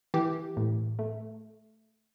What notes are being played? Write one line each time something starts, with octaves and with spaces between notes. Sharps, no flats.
E3 G4
A2
A3